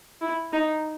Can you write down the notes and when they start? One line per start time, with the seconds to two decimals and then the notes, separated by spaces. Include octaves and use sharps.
0.21 E4
0.53 D#4